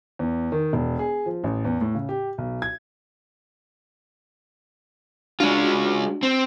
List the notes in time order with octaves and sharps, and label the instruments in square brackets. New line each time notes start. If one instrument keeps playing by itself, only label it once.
[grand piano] E2
D#3
E1
G#4
F3
A1
E2
A2
C#3
G4
B1
G#6
[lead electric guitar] G#3 F4 [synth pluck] D4 F#4
[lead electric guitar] C4